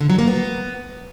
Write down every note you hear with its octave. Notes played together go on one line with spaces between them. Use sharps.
D3
F#3
A#3
B3